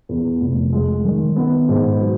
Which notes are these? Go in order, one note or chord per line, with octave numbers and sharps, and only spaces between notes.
E2
F1
G#3
D#3
B3
G#2
F#3